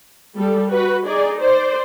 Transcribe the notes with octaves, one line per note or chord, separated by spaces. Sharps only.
G3 A4
F#4 B4
D#4 G#4 D5
C5 D5